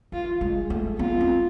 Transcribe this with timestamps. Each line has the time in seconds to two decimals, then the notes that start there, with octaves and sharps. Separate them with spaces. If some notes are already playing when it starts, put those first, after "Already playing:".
0.12 E3 F4
0.41 G#3
0.55 G#4
0.70 A3
0.99 B3 F4
1.21 C4